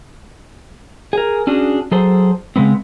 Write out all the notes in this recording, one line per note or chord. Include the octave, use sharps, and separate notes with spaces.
G#4 A#4
C#4 D4 F#4 G#4
F#3 G#4 A4 C5
C#3 G#3 B3 C4